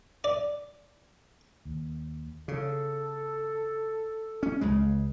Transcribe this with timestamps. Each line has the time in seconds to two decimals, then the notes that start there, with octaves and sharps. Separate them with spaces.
0.24 D5
1.65 D#2
2.48 C#3 A4
4.43 C#4
4.61 C#2 C#3 G#3